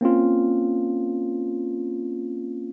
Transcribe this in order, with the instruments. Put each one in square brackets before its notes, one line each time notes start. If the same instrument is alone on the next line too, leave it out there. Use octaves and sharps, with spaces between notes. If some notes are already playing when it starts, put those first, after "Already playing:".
[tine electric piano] A#3 C4 C#4 F4